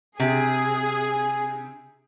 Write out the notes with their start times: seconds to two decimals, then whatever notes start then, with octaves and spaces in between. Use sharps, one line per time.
0.20 C3 G#4